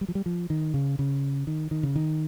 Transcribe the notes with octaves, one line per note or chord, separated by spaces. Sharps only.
G3
F3
G3
F3
D#3
C#3
C#3
D#3
D#3
C#3
D#3